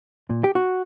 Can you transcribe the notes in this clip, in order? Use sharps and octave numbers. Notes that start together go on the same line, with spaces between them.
A#2
G4
F#4